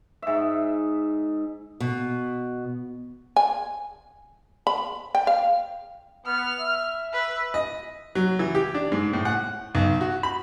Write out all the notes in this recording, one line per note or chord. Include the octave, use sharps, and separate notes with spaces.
G#2 E5
B2
G#5
B5
G5
F5
B3 F6
E5
B4
D#5
F#3
E3
G4
D4
G#2
A2
F#5
B1
F#4
B5